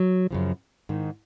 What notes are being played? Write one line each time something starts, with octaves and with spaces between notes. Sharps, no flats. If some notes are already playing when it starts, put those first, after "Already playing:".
Already playing: F#3
F#2 C#3 F3
G#2 D#3